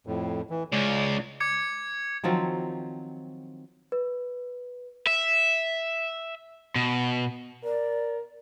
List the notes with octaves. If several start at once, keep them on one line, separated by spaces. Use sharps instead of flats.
F2 A2
E3
C#2 C#3 C#5 D5
D6 G#6 C#7
D#3 F3 F#3 C4
B4
E5
B2
A#4 D5